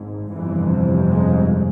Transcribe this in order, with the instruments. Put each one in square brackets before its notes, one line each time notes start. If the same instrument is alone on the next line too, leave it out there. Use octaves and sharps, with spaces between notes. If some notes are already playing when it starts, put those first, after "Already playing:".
Already playing: [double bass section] G#1 G#2
G1 F2 C3 E3
G#3